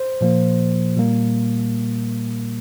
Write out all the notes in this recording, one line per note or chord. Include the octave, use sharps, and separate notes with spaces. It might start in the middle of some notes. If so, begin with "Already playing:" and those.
Already playing: C5
A#2 F3 A#3
A#2 G3 A#3